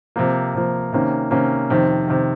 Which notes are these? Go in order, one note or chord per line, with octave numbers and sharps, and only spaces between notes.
C3 F3 A#3
C3 F3 A#3
C3 D#3 A#3 C#4
C3 D#3 A#3 C#4
F2 C3 D#3
C3 D#3